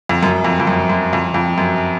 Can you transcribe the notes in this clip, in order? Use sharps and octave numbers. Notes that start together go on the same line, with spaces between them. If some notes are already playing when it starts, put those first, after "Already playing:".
F2
F#2
F2
F2
F#2
F#2
F2
F2
F#2